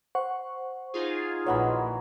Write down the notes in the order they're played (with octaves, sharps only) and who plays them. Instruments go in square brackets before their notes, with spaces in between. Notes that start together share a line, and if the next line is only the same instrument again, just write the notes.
[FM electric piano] C5 F#5 C#6
[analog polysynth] D#4 F4 G#4
[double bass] A#1 A#2 [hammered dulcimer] D#3 E3 F#3 [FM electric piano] C#5 F#5 B5